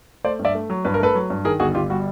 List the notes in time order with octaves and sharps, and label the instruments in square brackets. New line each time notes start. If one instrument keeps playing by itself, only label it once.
[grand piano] A3 C5 D5
G2
D5 E5
A3
F#3
G2 B4
A#4
A3 A4 B4
F#3
G2
D#3 G#4 A#4
G1 F#4 G#4
G1 F4 G4
G3 F#4